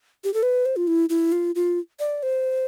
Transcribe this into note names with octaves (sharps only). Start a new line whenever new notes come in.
G4
A4
B4
C5
F4
E4
E4
F4
F4
D5
C5